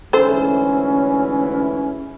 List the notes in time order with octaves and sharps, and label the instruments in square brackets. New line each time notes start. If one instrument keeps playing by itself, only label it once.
[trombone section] D2 G#2 E3 [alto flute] C#4 [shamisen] A4 C5